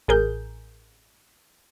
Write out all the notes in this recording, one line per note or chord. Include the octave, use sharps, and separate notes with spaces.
A1 G#4 A#4 G6